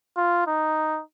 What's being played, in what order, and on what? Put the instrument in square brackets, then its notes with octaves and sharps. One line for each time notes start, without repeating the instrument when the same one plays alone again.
[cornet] F4
D#4